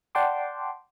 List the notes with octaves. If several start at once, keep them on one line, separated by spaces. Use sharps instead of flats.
D5 F#5 G5 A5 C6 D6